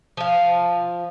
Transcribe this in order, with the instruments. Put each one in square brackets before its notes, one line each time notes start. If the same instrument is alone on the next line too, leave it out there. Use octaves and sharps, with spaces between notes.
[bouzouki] F3 F5